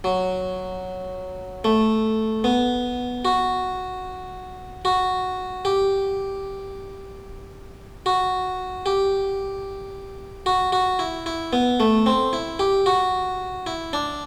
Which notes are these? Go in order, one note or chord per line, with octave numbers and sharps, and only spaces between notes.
F#3
A3
B3
F#4
F#4
G4
F#4
G4
F#4
F#4
E4
E4
B3
A3
C4
E4
G4
F#4
E4
D4